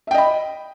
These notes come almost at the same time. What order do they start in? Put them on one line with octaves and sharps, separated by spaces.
E5 G5 D#5 B5